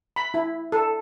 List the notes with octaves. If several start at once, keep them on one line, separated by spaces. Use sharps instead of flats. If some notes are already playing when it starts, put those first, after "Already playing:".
B5
E4
A4